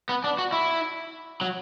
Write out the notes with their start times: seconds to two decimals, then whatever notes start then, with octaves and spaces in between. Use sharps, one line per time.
0.09 B3
0.24 D4
0.38 F#4
0.52 E4
1.41 F#3